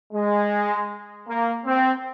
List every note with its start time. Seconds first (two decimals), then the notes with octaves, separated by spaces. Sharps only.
0.13 G#3
1.27 A#3
1.65 C4